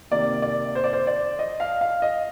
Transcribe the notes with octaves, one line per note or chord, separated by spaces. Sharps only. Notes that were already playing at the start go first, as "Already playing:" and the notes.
C3 D#3 A#3 D5
D5
C5
D5
C5
D5
D#5
F5
F5
D#5